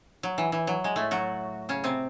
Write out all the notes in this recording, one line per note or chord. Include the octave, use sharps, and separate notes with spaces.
F#3
E3
E3
F#3
G#3
A2 A3
F#3 F#4
C#3 C#4
C3 C4